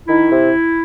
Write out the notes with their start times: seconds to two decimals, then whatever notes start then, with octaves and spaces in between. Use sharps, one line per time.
0.08 D#3 E4
0.30 C3